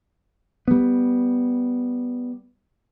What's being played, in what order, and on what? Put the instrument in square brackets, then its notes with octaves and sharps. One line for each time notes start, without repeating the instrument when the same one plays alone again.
[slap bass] G3 B3